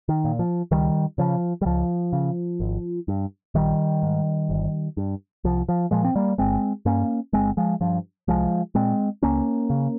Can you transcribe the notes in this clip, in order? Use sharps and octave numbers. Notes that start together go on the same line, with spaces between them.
D#3
A#2
F3
C#2 D#3 G3
C#3 F3
G3
C#2 F3
C#3
G#1
G2
A#1 D#3 G3
G#2
G1
G2
C2 F3
F3
A#2 F3 G#3
C4
G3 A#3
G1 G#3 C4
G2 A#3 C#4
G1 G#3 C4
F3 G#3
G2 F3
C2 F3 G#3
A#2 G#3 C4
C#2 A#3 C#4
C#3